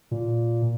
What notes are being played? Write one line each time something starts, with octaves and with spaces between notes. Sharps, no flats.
A#2